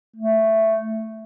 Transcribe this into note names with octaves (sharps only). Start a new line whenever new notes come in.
A3